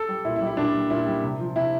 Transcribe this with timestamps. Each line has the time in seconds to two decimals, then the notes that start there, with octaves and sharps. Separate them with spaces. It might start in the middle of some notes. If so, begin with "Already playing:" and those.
Already playing: A4
0.08 G3
0.24 A#2 E4
0.36 E4
0.41 G3
0.47 E4
0.57 A#2 D4
0.74 G3
0.90 A#2 E4
1.06 G3
1.23 C3
1.39 F3
1.56 C3 E4